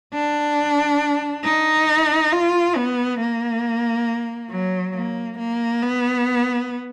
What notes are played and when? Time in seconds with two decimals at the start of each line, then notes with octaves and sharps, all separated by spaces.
0.14 D4
1.44 D#4
2.33 F4
2.76 B3
3.20 A#3
4.50 F#3
4.95 A#3
5.39 A#3
5.82 B3